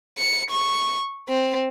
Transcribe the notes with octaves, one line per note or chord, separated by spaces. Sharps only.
C#7
C#6
C4